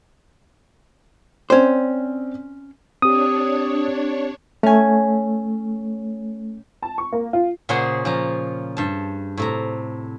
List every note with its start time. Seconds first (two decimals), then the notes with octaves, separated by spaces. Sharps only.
1.50 C4 C#4 C5 D5
3.02 C4 D4 G4 C#5 D#6
4.63 A3 C#4 G#5
6.82 A5
6.98 C#6
7.12 A#3
7.33 F4
7.69 A#2 C#3 C#4 G#4 C5 F#5
8.05 F3 C#4 A#5
8.77 G2 A5
9.37 A2 C3 A#5